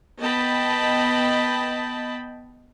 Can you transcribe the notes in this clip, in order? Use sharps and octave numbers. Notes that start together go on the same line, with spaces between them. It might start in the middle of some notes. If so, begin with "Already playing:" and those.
B3 D#5 G5 A5 B5